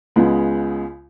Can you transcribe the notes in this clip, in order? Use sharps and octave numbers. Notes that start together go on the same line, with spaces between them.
C#2 C#3 G#3 B3